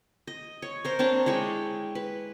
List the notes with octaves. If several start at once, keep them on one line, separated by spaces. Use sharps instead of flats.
D#5
C#5
A#4 C5 A#5
C4 D4 C#5 A5
G#3 E4 C#5 G5
B4